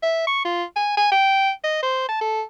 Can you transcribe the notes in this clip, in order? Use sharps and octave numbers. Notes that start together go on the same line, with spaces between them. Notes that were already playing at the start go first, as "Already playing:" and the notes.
E5
C#6
F4
G#5
G#5
G5
D#5
C5
A5
A4